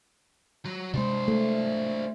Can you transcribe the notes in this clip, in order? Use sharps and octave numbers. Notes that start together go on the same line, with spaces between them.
F#3
C3 G#3 D4 C5
A3